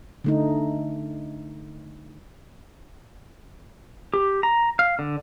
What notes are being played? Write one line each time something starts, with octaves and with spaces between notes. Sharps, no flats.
D3 A3 D#4
G4
A#5
F5
D3